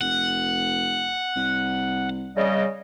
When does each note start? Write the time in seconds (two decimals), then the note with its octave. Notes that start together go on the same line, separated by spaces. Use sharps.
0.01 F1 F#5
1.36 C2
2.36 C#3 G3 D#5